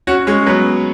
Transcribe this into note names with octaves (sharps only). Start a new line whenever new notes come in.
C#4 F#4
G#3 C#4
F#3 B3